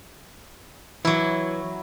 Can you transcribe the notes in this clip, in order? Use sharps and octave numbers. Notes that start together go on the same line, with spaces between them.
E3 F#3 E4